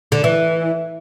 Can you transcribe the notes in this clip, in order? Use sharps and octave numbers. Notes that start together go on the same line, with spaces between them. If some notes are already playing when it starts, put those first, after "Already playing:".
D3
E3